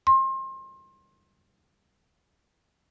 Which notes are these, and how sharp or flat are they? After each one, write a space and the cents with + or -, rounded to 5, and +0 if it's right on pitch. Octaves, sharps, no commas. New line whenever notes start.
C6 +30